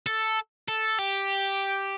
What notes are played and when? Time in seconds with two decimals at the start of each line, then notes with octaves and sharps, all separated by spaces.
0.07 A4
0.68 A4
0.99 G4